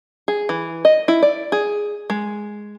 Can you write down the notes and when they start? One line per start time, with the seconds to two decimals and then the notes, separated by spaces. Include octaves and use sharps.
0.28 G#4
0.49 E3
0.85 D#5
1.08 E4
1.23 D5
1.52 G#4
2.10 G#3